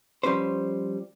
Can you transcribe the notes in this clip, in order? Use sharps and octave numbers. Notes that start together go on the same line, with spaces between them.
F3 G3 C#4 B4 C5